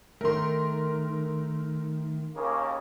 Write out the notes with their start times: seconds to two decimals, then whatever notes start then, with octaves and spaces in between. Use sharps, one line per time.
0.21 D#3 A3 A#4 C6
2.35 D#2 C#3 A#3